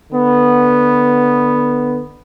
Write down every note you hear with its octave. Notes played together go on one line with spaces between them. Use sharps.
D3 B3